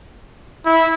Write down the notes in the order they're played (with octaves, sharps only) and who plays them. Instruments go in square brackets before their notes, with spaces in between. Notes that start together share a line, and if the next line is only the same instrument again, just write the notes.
[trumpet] E4